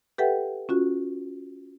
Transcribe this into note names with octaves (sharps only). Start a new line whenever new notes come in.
G4 A4 B4 E5 F#5 G5
C#4 F4 F#4